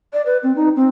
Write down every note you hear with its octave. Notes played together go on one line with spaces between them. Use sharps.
D5
B4
C4
D#4
C4